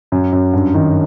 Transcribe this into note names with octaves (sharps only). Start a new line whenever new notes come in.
F#2
F#2
G2
D#3